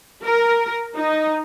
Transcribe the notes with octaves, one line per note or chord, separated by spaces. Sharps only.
A#4
D#4